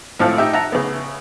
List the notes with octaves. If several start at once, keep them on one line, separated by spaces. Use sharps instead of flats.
G#1 A2 F3 A4 F5
D#4 G4 E5
E5 F#5 A5 A#5
C#3 B3